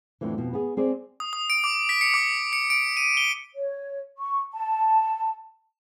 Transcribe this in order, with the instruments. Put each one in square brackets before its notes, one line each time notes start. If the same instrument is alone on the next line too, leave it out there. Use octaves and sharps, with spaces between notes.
[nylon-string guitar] F2 A2 D3 E3
F2 B2 B3
B3 G#4
C4 G#4 D5
[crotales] D#6
D#6
D7
D6
B6
C#7
D6
C#7
D7
D#7
G7
[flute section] C#5
C#6
A5